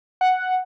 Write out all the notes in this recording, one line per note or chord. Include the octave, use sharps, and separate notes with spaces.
F#5